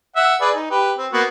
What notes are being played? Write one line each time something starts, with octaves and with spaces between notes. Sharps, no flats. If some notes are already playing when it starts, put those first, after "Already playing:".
E5 F#5
G#4 B4 D5
D#4
G4 B4
C4
A#3 B3 F#4